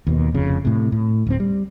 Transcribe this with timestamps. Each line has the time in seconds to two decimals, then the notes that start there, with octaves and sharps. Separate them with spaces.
0.07 D#2 B2
0.34 F1 F2 C#3
0.65 A2 C3
0.92 A2
1.27 D1 C4
1.40 G3